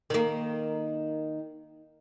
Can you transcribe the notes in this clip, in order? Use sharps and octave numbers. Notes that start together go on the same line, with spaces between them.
D#3 A#3